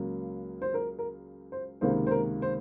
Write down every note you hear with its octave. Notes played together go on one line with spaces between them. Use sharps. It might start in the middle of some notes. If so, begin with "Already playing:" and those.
Already playing: C#2 C#3 F#3 A#3
C5
A#4
A#4
C5
C#2 C3 D#3 A#3 C5
C5
A#4
C5